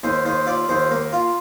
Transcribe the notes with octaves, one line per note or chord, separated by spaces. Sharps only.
D#2 C5
D#2 C5
F4 D5
D#2 C5
A#3
F4